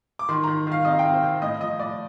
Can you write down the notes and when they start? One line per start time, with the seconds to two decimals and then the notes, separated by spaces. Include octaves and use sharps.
0.19 D6
0.29 D#3 C6
0.44 D#3 A#5
0.67 D#3 F5
0.85 C3 D#5
0.99 G5
1.04 C3
1.14 C5
1.23 C3
1.42 A2 D#5
1.61 F3 D#5
1.79 A2 D5